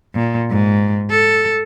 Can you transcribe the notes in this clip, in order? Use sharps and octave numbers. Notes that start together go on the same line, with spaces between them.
A#2
G#2
A4